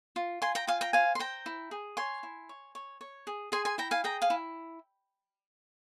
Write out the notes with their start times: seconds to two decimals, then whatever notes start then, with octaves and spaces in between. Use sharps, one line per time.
0.16 F4
0.42 F4 G#5 C6
0.55 G5 A#5
0.67 F4 F5 G#5
0.81 G5 A#5
0.93 C5 F5 G#5
1.15 C6
1.19 C5 G5 A#5
1.46 E4
1.71 G#4
1.97 C#5 G#5 C6
2.23 E4
2.49 C#5
2.75 C#5
3.01 C#5
3.27 G#4
3.52 G#4 G#5 C6
3.65 G#5 C6
3.78 E4 G5 A#5
3.91 F5 G#5
4.04 G#4 G5 A#5
4.22 F5 G#5
4.30 E4